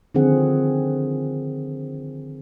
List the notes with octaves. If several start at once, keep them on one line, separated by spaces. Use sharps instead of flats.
D3 D#3 F3 C4 G#4 F#5